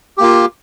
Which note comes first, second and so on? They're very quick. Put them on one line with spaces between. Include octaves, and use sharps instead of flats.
G4 A#3 F4